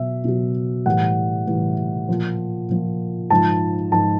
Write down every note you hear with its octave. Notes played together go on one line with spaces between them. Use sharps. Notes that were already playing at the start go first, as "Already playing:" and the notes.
Already playing: B2 F#3 E5
B2 F#3
A2 E3 G3 F#5
A2 E3 G3
A#2 F3
A#2 F3
G#2 F3 A5
G#2 F3 A5